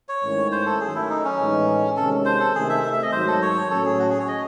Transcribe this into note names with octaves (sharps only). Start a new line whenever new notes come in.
C#5
G#2 D#3 A3 C#4 E4
C5
A4
D#3 F#3 A3 G#4
E4
D#4
C#4
A2 E3 G#3 D#4
C3 D#3 G#3 C#4 A4
C5
A4
C3 D#3 A3 D#4 G#4
E5
E5
E5
D#5
G#2 D#3 F#3 C5
A4
C#5
A2 F#3 A3 C#4 A4
G#4
F#4
G#4
C#5
D#5